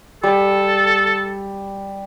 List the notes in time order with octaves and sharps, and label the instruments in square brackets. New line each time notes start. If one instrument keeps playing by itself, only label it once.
[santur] G3 [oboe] A4